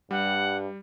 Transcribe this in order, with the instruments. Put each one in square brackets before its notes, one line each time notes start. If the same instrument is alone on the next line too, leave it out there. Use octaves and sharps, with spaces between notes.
[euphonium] G2 [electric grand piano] G3 [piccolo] F#5